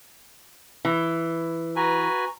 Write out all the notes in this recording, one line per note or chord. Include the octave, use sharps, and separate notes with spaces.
E3
F#4 B4 G#5 A#5